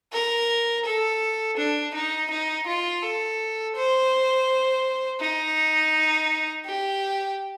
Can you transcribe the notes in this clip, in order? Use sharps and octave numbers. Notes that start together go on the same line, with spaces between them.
A#4
A4
D4
D#4
D#4
F4
A4
C5
D#4
G4